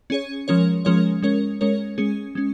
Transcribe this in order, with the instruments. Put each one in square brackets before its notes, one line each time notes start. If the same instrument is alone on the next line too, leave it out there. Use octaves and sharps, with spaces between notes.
[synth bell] C#4 G#4 C#5
F3 G#3 C#4 A#4 C#5
F3 G#3 C#4 A#4 C#5
G#3 C#4 A#4 C#5
G#3 C#4 A#4 C#5
G#3 C#4 G#4
G#3 C#4